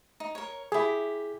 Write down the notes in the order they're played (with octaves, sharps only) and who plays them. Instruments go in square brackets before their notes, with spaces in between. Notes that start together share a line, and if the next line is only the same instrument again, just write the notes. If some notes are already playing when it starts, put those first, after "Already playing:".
[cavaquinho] D#4
A#4 C#5
[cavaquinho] E4 G4 [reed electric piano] G#4